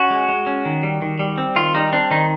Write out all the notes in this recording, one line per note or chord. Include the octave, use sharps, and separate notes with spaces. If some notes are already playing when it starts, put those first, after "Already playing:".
Already playing: C#4 F#4
G#3
G#3
C#4
D#3
G3
D#3
G3
C4
D#3 F4
G3 D#4
C4 D4
D#3 D#4